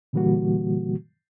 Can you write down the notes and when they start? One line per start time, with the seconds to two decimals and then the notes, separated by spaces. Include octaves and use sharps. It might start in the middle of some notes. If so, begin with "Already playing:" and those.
0.13 A#2 D3 E3 G3 A#3 F#4